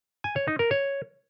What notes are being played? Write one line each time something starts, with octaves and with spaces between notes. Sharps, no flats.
G#5
C#5
D#4
A#4
C#5